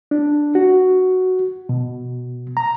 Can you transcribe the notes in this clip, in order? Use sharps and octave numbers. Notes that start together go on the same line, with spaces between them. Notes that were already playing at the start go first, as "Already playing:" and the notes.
D4
F#4
B2
A#5